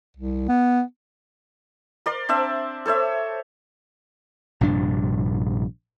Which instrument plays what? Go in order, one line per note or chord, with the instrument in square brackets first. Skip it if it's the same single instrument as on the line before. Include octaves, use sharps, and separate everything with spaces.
[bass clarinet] C2
B3
[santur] A#4 D5 C6
C4 D4 E5 A5
A4 C5 C#5 E5
[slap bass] A#1 G2 C3 D4